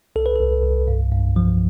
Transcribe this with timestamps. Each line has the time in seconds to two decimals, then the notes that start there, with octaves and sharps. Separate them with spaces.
0.16 C2 A4
0.26 B4
0.36 C2 A4
0.63 C2
0.88 G2
1.12 G2
1.36 F3